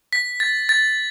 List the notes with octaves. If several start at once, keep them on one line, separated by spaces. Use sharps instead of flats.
B6
A6
A6